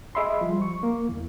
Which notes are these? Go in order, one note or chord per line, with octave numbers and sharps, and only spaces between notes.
G#4 D#5 E5 B5 C6
F3 G3
C#6
A#3
E2 E3